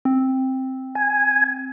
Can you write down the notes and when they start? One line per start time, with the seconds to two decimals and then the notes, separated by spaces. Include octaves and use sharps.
0.05 C4
0.95 G#5